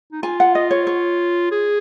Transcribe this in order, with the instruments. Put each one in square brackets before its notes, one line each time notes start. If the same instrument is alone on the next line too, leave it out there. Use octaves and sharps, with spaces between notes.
[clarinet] D#4
[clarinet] F4 [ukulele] G#5
[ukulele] F#5
D#5
C#5
C#5
[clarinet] G#4